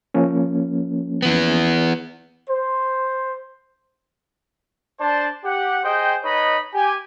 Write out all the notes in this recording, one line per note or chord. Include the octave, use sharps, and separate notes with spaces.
F3 A#3 C#4
E3 B3
C5
D4 C5 D5 A5
G4 F#5
G#4 C5 D#5 G5
D#4 B4 C#5 D#5 B5
G4 G#5